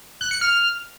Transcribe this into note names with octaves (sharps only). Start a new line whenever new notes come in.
F#6
C#7
F6